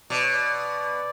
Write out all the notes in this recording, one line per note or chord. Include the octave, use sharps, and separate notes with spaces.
B2 D5
C#5
D5